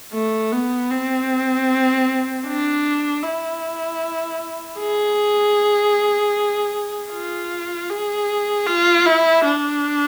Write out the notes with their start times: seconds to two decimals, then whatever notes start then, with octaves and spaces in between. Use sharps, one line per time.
0.13 A3
0.52 B3
0.90 C4
2.46 D4
3.23 E4
4.80 G#4
7.11 F4
7.90 G#4
8.67 F4
9.06 E4
9.45 D4